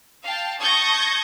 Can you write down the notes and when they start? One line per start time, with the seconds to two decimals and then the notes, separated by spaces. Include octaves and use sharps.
0.24 F5 G5 A5
0.60 A5 C#6 D#6 G6 G#6 A#6